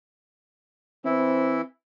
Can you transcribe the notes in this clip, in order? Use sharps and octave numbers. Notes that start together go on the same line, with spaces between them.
E3 C4 E4